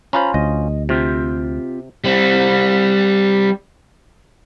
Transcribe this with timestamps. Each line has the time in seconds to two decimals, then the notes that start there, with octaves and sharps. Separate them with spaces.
0.13 C#4 F4 C5 A#5 B5
0.34 D2 D#5
0.89 C3 C4 F4 G4
2.04 G3 C4